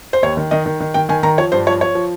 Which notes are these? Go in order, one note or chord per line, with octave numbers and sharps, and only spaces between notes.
C5
D#2 C#5
D#3
D#3 D#5
D#3
D#3
D#3 G5
D#3 G#5
D#3 A#5
F3 C#5
G2 C5
F3 C#5
F3 C#5
F3